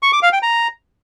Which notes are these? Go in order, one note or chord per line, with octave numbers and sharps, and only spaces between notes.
C#6
D6
F5
G5
A#5